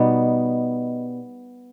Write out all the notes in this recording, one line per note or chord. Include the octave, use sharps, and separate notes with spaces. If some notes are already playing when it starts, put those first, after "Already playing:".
Already playing: B2 G3 B3 D#4